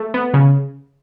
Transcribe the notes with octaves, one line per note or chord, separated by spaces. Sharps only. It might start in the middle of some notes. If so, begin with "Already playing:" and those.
Already playing: A3
B3
C#3